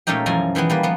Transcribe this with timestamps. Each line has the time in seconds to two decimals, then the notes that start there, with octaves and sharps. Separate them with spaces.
0.07 A#2 G#3 A3 C#4 D#4 G4
0.26 F#2 B2 E3 F3 G#5 A#5
0.55 D#3 E3 G#3 B3
0.70 G3 A#3 B4
0.83 F3 B3